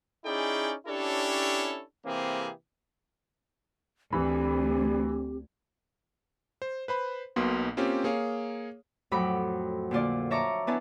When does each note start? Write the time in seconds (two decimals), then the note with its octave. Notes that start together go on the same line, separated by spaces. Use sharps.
0.25 C#4 D#4 E4 G#4 D5 G5
0.88 C#4 D4 E4 G4 A4 C#5
2.05 C3 E3 A#3 C4 G4 G#4
4.13 D2 E3 C4 G4 B5
6.62 C5
6.88 B4 C5 B5
7.36 B1 B2 A#3 C6
7.77 A#3 C4 C#4 F4 G4
8.04 A#3 G#4 C#5 F5
9.11 F2 A2 F#3 B5 D6
9.91 A#2 D3 F4 D5
10.31 C#5 E5 A5 A#5 C#6 D6
10.67 B3 D4 E4 B4 G#5 A5